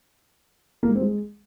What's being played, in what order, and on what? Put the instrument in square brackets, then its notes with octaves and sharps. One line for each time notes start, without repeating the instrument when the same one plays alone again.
[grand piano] A#3
G#3
C4
G#3